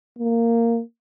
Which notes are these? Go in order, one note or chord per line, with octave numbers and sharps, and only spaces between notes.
A#3